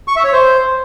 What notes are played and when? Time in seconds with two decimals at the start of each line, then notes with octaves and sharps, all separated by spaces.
0.08 C#6
0.16 E5
0.24 C#5
0.33 C5